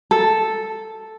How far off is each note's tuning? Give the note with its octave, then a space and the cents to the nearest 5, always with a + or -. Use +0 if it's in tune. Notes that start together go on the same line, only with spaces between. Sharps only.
A4 +0